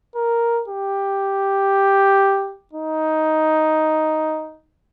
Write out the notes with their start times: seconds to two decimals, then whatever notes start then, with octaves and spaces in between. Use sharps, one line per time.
0.16 A#4
0.68 G4
2.73 D#4